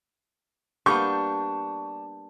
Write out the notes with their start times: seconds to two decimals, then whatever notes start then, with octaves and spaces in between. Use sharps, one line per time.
0.86 G3 A#3 B3 D4 C#6 G6